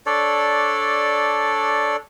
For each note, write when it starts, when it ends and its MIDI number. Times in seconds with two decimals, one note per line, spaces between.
0.06 1.96 62
0.06 1.96 69
0.06 1.96 73
0.06 1.96 74